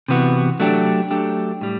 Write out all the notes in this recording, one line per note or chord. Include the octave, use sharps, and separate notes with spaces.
C3 E3 B3 F#4
F#3 A3 D4 G4
F#3 A3 D4 G4
A2 G3